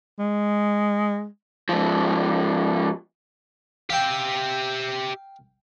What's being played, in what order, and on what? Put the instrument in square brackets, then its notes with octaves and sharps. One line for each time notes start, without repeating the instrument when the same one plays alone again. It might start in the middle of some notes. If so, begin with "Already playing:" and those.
[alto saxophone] G#3
[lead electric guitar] G#2 F3
[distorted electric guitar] G4 E5 [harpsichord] F5 G5